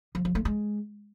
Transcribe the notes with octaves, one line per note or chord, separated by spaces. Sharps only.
F3
F3
A3
G#3